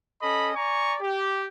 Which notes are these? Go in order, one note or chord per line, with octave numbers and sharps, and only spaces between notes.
C#4 A4 D#5 B5
D5 G#5 A#5 C#6
G4